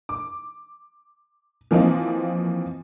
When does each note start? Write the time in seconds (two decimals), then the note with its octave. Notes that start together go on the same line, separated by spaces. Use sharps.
0.09 D6
1.71 E3 F3 A#3 C4 D#4